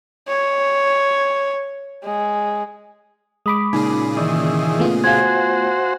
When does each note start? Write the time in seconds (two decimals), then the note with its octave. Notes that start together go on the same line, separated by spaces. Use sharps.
0.28 C#5
2.04 G#3
3.46 G#3 B5 D6 D#6
3.73 A#2 C#3 D#4 G#4
4.17 D#3 E3 D5
4.79 A3 B3 F4
5.04 F#4 C5 F5 G#5 G#6